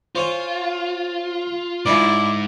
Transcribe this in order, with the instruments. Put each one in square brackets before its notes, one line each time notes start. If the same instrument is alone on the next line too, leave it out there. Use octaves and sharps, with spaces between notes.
[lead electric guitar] F4 [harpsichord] C5 C#5 G#5
[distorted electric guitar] G#2 [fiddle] E4 [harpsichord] D5 D#5 G#5